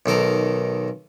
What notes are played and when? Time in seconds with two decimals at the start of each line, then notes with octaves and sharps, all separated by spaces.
0.06 B1 D#3 A4 A#4